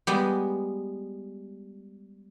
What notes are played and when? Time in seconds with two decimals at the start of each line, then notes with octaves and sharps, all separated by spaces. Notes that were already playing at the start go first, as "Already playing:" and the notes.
0.07 G3 G#3 B3 G5